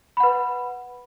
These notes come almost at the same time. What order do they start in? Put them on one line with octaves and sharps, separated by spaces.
B5 F#5 B4